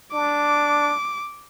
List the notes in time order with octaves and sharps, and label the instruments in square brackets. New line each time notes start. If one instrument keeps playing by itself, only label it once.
[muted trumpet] D4 [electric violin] D6